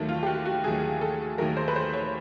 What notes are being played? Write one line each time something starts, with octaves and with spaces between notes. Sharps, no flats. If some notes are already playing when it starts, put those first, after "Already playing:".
Already playing: D#2 D#3 F#3 A3
F4
G4
F#4
F#4
D#2 D#3 F#3 A3 G#4
A4
D#2 D#3 F#3 A3 A#4
C5
B4
C5
C#5